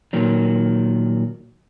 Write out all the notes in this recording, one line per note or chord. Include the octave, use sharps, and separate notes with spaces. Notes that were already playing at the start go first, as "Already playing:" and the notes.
A#2 D#3 F#3